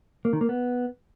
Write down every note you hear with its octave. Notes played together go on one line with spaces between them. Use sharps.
A#3
D#3
A#3
B3